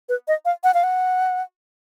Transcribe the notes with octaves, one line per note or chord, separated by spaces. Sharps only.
B4
D#5
F5
F#5
F5
F#5